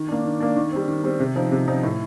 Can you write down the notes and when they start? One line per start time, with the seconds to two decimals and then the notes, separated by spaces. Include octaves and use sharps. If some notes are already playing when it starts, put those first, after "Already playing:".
Already playing: D#3
0.08 A#3 D4
0.24 D#3
0.40 A#3 D4
0.56 D#3
0.72 G3 C4
0.88 D#3
1.04 G3 C4
1.20 C3
1.36 F3 C4 D#4
1.52 C3
1.67 F3 C4 D#4
1.83 A2